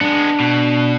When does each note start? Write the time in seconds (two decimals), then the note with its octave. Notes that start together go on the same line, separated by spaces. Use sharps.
0.01 G#3 B3 D4
0.40 B2